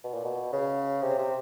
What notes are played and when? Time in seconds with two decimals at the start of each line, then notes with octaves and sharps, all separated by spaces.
0.04 B2
0.14 A#2
0.25 B2
0.53 C#3
1.02 C3
1.19 C3